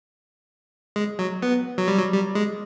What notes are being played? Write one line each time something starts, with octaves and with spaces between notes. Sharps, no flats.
G#3
F#3
B3
F#3
G3
F#3
G3
G#3